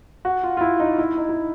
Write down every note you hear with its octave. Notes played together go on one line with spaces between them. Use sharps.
F#4
F4
F4
E4
D#4
E4
D#4
E4